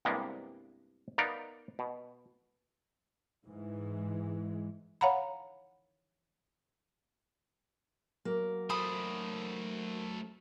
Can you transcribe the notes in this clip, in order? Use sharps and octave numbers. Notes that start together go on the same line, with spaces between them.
C2 G2 C3 G#3 A#3 B3
B3 D#4 A#4 D5 F5 A#5
B2
G#2 E3 G#3
C#5 F5 F#5 A#5 B5
F#3 A#3
A3 C5 B5 D#6